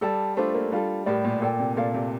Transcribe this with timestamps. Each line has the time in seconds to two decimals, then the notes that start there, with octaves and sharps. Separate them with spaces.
0.01 G3 A4 D5 A5
0.37 A3 D4 F4 A4 C5
0.55 A#3
0.71 G3 D4 F4 A4
1.06 A2 G4 A#4 D5
1.25 A#2
1.42 A#2 A4 D5 G5
1.59 C3
1.76 A#2 A4 D5 F5
1.94 C3